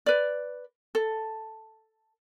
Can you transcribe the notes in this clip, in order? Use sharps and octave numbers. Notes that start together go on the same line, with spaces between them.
B4 D5
A4